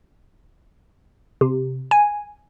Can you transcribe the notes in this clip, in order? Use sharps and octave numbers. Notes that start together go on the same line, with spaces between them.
C3
G#5